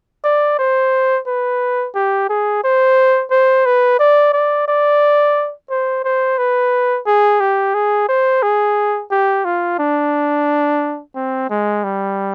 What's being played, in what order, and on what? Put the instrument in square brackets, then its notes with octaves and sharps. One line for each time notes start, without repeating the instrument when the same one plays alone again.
[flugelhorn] D5
C5
B4
G4
G#4
C5
C5
B4
D5
D5
D5
C5
C5
B4
G#4
G4
G#4
C5
G#4
G4
F4
D4
C4
G#3
G3